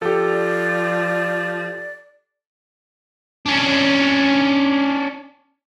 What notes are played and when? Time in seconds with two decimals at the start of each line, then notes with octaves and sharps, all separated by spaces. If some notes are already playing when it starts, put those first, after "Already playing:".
0.02 F3 G4 A4 D5
3.46 C#4 D4